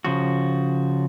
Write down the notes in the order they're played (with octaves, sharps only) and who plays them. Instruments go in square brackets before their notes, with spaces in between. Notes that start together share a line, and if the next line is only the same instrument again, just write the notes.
[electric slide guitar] C#3 F3 F#4